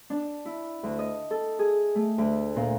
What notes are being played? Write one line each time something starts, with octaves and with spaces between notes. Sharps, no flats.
D4
E4
D2
D#5
A4
G#4
A3
D2
A#2